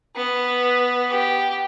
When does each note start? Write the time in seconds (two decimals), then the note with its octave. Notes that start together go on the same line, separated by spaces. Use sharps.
0.15 B3
1.09 G4